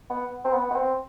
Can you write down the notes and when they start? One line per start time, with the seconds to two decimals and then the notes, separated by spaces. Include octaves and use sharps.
0.10 B3
0.44 C4
0.54 B3
0.71 B3
0.76 C4